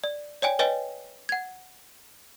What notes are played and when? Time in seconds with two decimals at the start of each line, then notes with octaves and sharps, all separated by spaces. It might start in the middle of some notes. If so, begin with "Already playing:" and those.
0.04 D5
0.42 C#5 D5 G5 G#5
0.59 B4 C#5 D#5 G5 G#5
1.29 F#5 G#6